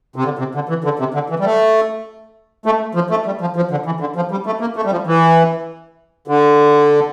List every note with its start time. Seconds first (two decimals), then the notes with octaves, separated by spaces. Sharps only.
0.16 C3
0.24 D3
0.39 C3
0.55 D3
0.69 E3
0.84 D3
0.99 C3
1.14 D3
1.30 E3
1.39 G3
1.44 A3
2.66 A3
2.95 F3
3.10 A3
3.26 G3
3.41 F3
3.56 F3
3.71 D3
3.86 E3
4.00 D3
4.16 F3
4.31 G3
4.46 A3
4.61 A#3
4.76 A3
4.85 G3
4.92 F3
5.07 E3
6.28 D3